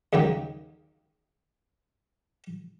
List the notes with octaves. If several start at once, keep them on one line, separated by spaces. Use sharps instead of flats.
D#2 C#3 F#3 G#3 G5